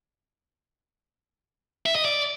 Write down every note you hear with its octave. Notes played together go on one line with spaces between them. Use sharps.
E5
D#5
D5